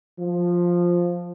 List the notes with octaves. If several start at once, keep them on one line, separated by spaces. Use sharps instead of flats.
F3